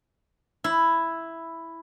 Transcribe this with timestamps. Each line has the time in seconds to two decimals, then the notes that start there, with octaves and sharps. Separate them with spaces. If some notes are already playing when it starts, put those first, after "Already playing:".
0.64 E4